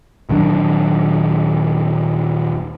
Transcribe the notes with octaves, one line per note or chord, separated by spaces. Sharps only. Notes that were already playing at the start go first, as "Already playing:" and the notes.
D#1 D#3 F#3 D4